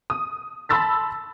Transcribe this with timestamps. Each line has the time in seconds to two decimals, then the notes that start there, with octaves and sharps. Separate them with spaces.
0.10 D#6
0.69 A5 B5 C6 E6 A6 B6